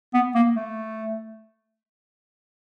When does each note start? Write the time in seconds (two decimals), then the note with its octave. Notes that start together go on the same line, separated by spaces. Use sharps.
0.14 B3
0.35 A#3
0.56 A3